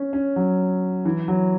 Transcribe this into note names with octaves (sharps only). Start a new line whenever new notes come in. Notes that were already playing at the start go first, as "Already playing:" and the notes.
Already playing: C#4
C#4
F#3
E3
F#3